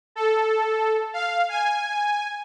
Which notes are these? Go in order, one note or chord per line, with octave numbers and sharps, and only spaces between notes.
A4
F5
G#5